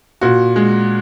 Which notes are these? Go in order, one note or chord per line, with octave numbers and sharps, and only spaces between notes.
A#2 F#4
G#3